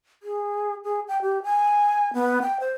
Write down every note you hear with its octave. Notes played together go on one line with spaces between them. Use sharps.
G#4
G#4
G5
G4
G#5
B3
G5
C5